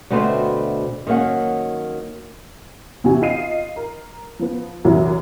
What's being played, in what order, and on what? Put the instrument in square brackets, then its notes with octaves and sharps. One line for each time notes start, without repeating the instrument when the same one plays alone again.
[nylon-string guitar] D2 B2 A3 C4 B4 C5
D#3 F#3 A#3 C#4 F#5
[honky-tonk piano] E2 C3 F#4 G#5
F4 D#5 C7 D#7
A#4
F3 B3
C2 F#2 E3 F#3